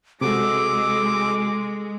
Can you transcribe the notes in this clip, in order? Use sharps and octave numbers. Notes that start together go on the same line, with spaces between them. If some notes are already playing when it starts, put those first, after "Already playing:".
C3 G#3 F#4 A4 D6